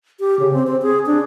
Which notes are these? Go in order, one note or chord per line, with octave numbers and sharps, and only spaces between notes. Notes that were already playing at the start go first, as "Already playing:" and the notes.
G4
C#3
C4
C4
G#4
D4